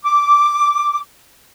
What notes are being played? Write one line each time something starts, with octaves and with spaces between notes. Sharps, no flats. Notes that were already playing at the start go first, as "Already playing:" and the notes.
D6